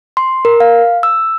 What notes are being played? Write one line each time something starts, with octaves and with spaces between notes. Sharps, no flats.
C6
A#4
F5
E6